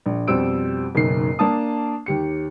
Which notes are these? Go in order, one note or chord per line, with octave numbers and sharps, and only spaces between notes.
A#1
F2 B2 G3 C5 E6 D7
F#1 B1 D#3 C7
A#3 D4 A5 D#6
D#2 G4 C#7